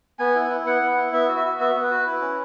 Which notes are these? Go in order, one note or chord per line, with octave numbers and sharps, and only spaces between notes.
B3 G#5
E4
E4
B3 F#5
B3
E4
B3 E5
F#4
E5
F#4
B3 E5
B3
B4
F#4
E4
C#4